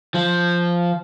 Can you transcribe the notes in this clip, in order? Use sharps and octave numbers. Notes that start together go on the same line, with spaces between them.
F3